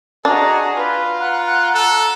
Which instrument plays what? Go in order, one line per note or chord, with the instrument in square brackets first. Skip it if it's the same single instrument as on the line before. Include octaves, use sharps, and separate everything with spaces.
[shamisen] D4 [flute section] F#4 D#5 A#5 [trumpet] G#4
[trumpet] F4 [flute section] B4
[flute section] F#5 F#6 [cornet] A#5
[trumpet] A4